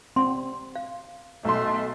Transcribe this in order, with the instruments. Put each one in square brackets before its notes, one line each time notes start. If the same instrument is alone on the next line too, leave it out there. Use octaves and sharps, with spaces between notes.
[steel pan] C4 [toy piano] C6
[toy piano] F5
[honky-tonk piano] B1 C6 [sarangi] A3